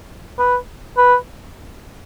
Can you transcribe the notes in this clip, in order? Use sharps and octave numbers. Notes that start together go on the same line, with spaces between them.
B4
B4